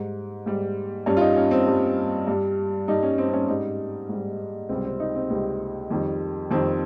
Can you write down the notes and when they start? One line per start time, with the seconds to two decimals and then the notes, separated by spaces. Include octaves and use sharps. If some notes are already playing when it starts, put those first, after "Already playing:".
Already playing: G#2 G3
0.46 G#2 G3
1.06 G2 G3 C#4
1.17 F4
1.21 D#4
1.36 C#4
1.51 C4
1.67 G2 G3
2.27 G2 G3
2.88 G2 G3 D#4
3.03 C#4
3.18 C4
3.29 C4
3.33 C#4
3.48 G#2 G3 D#4
4.09 G#2 G3
4.69 C#2 C3 G3 C4
4.85 C4
5.00 D#4
5.15 C4
5.30 C#2 C3 G3
5.91 F2 D#3 G3
6.51 F2 D#3 G3 C4